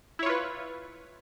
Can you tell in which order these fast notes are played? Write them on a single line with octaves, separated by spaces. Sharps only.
E4 C#5 F4 B4